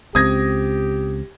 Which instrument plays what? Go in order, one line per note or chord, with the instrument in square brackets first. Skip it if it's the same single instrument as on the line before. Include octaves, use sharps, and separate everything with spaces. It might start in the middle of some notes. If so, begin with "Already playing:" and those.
[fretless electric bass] C#2 C4 [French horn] G4 [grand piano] D#6 G#6 A#6